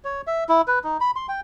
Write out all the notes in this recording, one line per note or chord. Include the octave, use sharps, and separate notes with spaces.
C#5
E5
E4
B4
D#4
B5
C6
G5